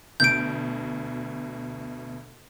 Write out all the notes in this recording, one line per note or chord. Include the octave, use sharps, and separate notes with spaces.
D2 B2 G6 D7